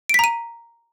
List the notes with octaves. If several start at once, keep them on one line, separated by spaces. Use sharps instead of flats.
A#5 B6 D7 D#7